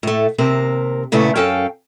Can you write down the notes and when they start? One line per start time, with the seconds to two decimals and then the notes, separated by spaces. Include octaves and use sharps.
0.03 A2 A3
0.38 D#2 C3 C4 A#4
1.12 A#2 C#3 A3 B3 E4
1.36 F#2 C#4 A4 F5 G5